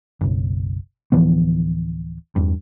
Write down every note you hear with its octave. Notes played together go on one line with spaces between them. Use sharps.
F#1 B1
D1 E3 F3 B3
E2 G2